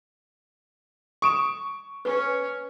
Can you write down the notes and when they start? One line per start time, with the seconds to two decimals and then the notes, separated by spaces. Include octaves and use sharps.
1.22 C#6 D#6 D7 E7
2.05 C#4 B4